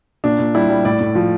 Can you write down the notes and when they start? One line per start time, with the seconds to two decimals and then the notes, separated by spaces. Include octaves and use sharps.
0.24 A#2 D4
0.39 A#2
0.55 G3 E4
0.70 G3
0.85 A2 D5
1.01 A2
1.15 F3